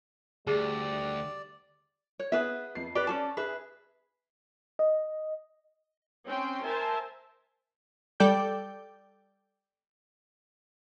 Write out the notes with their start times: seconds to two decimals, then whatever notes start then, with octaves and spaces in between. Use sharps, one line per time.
0.47 D2 G3 G#4 D5
2.19 C#5
2.32 B3 G#4 B4 E5
2.75 F2 C7
2.95 G4 B4 D5
3.07 C#4 G#4 A5
3.37 G#4 B4 E5
4.79 D#5
6.27 C4 C#4 G5 C6
6.64 A#4 C5 E5 G#5 A5
8.20 G3 A4 D5 G5 D6 G6